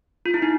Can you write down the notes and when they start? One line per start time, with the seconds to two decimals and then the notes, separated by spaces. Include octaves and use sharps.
0.26 F4
0.34 E4
0.42 D#4